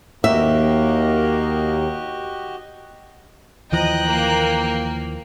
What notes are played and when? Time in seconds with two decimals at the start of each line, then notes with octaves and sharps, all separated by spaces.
0.24 D#2 A#3 F#4 G4 D#5 E5
3.72 D#2 E3 F3 D#5 G5 A#5 F#6
4.06 A#3